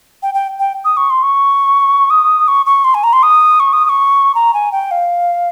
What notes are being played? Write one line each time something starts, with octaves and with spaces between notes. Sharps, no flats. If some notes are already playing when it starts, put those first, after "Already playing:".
G5
G5
G5
D#6
C#6
C6
C#6
D#6
C#6
C#6
C6
G#5
A#5
C6
D#6
C#6
D#6
D#6
C#6
A#5
G#5
G5
F5